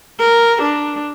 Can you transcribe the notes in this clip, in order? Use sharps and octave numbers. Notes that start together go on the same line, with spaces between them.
A#4
D4